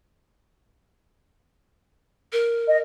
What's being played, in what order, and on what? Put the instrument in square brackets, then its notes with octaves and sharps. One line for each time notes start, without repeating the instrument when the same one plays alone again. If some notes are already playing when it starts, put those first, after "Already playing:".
[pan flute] A#4
[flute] D#5